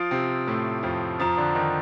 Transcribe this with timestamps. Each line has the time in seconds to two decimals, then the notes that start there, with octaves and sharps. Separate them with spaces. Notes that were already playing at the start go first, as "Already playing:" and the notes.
Already playing: F3 F4 D#6 A6 D7
0.11 C3 C4
0.47 A2 A3
0.83 F2 F3
1.19 F2 F3 A#5 D#6 A6
1.37 D3 D4
1.55 D#3 D#4